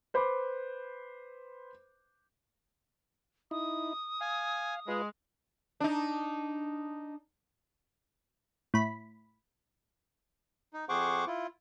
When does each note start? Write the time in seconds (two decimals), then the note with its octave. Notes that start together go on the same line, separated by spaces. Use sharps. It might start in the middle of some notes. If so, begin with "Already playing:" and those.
0.14 B4 C5 B5 D6
3.51 D#4 E4 D#6
4.21 F5 G#5
4.88 G#3 F4 B4
5.80 D4 D#4
8.74 A2 B5
10.73 D#4
10.89 F2 G#4 C5 F#5 C#6 D6
11.27 E4 F4